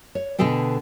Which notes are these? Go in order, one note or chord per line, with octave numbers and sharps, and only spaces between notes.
C#5
B2 D3 B3 G#4 A4 G5